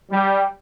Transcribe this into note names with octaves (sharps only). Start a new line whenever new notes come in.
G3